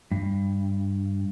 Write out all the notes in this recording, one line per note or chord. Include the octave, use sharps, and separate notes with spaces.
G2